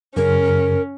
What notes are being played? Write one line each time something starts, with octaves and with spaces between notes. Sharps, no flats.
F#2 C#3 C#4 A#4